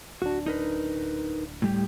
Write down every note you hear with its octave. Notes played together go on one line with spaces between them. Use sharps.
D1 D4 F#4
D#4 A#4 B4
A2 G3 G4